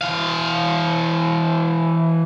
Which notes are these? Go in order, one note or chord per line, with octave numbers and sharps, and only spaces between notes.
E3 F5